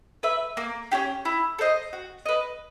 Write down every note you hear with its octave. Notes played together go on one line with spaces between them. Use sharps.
B4 E5
A#3
C#4 E4 G4
E4
A4 C5 D#5
F#4
B4 D#5